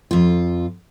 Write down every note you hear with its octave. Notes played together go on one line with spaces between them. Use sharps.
F2 F4